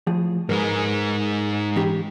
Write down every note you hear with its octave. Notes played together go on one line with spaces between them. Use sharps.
A2 F3 G#4
G#2 G#3 A#4 B4
E3 C#4 G4